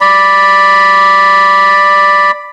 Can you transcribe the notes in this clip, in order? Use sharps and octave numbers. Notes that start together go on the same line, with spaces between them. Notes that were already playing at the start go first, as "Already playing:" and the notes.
D5 B5